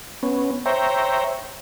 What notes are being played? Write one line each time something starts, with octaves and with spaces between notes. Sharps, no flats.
B3 C#4
C5 C#5 E5 G5 A#5